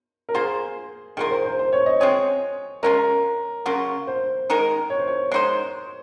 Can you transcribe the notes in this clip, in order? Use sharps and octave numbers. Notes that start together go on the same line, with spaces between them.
A#4
A#3 F4 G#4 C5
D#3 A#3 F4 G#4 A#4
C5
C5
C5
C#5
D#5
G#3 C4 F4 G#4 C#5
G#3 C#4 F4 A#4
C#3 F#3 A#3 F4
C5
D#3 G#3 D#4 A#4
C#5
C5
C#5
G#3 D#4 F#4 C5